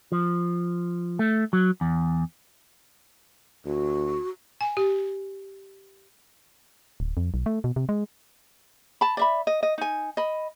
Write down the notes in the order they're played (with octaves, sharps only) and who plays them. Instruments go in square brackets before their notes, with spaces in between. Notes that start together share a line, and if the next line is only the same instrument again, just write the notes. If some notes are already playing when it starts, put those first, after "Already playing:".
[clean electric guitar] F3
A3
F#3
E2
[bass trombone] D2 [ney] F#4
[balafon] G#5
G4
[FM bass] D1
F2
B1
A3
B2
C3
G#3
[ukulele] A5 B5
D5 E5 B5
D#5
D#5
D#4 G#5
D#5 B5